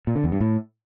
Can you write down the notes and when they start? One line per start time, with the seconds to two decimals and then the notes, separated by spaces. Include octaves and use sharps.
0.07 A#2
0.16 D3
0.24 E2
0.32 G2
0.40 A2